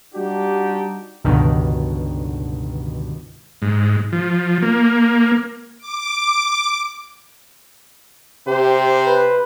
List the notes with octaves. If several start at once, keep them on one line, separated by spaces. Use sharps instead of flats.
G3 D4 D#4 F#4 G4
C#2 G2 B2 D3 D#3
G#2
F3
A#3
D6
C3 G4 C5
B4